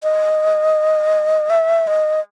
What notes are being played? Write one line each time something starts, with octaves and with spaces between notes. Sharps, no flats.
D#5
E5
D#5